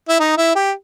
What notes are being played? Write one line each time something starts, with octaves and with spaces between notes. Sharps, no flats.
E4
D#4
E4
G4